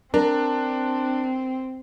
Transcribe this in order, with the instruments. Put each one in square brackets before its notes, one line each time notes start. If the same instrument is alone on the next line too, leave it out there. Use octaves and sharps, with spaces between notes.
[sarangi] C4 [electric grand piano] D4 [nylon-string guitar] A#4